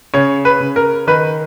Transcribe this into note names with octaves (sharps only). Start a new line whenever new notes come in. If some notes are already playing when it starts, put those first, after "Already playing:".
C#3 C#5
B4
C#3
A#4
D#3 B4